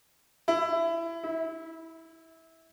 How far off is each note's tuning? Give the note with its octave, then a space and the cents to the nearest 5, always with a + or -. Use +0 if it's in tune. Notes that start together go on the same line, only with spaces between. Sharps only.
E4 +20
E4 -20